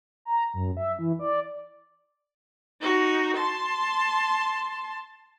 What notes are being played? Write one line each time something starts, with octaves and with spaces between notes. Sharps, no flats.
A#5
F#2
E5
E3
D5
D#4 F#4
A5 C6